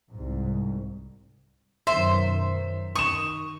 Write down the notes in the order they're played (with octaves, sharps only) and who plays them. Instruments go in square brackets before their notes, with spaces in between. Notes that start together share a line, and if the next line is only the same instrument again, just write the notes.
[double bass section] C2 G#2
[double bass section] F#2 B2 D#3 [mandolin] C5 [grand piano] E5
[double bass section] D#3 [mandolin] C#6 [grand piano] D#6 E7